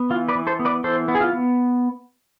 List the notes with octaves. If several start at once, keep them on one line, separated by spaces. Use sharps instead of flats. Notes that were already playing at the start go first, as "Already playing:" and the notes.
Already playing: B3
E3 F4
B4 D5
E3
A4 C5
B3
B4 D5
E3 A4 C5
B3
G#4
F4
B3